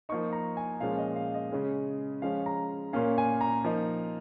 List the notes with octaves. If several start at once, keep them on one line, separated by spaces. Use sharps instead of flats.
F3 A#3 D#4 C#6
A#5
G#5
A#2 F3 G#3 C#4 F5
D#5
F5
D#5
C#3 G#3 C#4
F3 G#3 C#4 F5
A#5
A#2 A#3 C#4 F5
G#5
A#5
F3 A#3 D#4